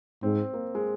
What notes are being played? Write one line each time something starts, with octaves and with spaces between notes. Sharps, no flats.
G#2 C4
A#3
G#3